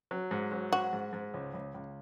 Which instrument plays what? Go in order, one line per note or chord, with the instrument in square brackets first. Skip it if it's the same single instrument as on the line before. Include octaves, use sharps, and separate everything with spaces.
[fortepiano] F#3
G#2
F#3
[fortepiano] G#2 [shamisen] F#4
[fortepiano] G#2
G#2
C#2
C#2
C#2